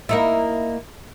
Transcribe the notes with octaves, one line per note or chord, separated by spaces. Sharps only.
A#3 D#4 E4